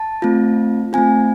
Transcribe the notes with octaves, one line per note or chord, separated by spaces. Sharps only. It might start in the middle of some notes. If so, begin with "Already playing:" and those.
Already playing: A5
A3 C4 F4
A3 C4 F4 G#5